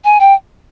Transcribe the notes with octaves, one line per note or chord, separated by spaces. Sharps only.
G#5
G5